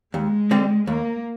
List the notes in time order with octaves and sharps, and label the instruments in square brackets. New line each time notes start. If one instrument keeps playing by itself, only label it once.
[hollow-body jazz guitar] D#2 [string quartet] G#3
[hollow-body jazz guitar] D3 G3 C4
[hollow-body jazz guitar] D#2 [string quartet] A#3